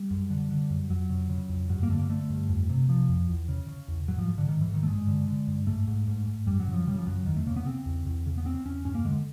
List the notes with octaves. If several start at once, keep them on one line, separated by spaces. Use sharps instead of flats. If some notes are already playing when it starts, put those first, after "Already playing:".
Already playing: G3
F#2
D3
D3
F#2
F2 F#3
C#3
C#3
F2
G2 F#3
A#3
D3 A3
A#3
D3 A3
G2
F2
C3
C3 F3
F2
E2
C#3
C#3
E2
G#2 F#3
F3
G#2
D3
G#2 D#3
E3
G#2
D#3
A3
G2 G#3
D3
D3
G2
G#2 A3
G#2
G#2
G#2
F#2 G3
F#3
C#3
F3
C#3 G3
F3
F#2 F#3
E2 D#3
A3
C#3 A#3
B3
C#3 C4
E2
E2
C#3
B3
C#3 C4
E2 C#4
G2 C#4
A#3
D3 G#3